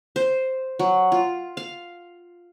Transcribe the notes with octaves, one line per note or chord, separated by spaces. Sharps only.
C5
F#3
F4
F5